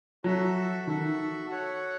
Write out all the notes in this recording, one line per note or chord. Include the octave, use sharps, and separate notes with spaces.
F#3 F#4 A4 E5
D#3 F#4 A4 E5
F#4 A4 C#5 F#5